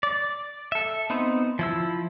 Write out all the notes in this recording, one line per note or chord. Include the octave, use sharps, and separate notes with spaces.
D5
A4 E5
B3 C4 D#4
F3 E4 E6